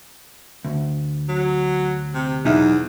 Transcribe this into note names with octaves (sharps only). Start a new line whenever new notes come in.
D2
F#3
C3
B1 E2 D#4 E5